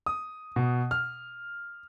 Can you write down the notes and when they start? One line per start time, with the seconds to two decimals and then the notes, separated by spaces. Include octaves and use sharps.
0.06 D#6
0.56 B2
0.91 F6